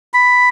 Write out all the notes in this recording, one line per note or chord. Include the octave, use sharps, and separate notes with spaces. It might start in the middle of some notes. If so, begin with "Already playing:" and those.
B5